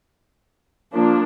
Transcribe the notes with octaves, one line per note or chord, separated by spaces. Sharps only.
F3 A#3 D4